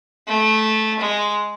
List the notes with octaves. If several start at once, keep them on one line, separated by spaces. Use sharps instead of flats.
A3
G#3